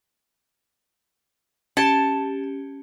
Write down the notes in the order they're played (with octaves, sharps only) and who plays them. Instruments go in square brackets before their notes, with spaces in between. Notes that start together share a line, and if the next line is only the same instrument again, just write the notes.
[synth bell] C#4 G4 [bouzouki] A5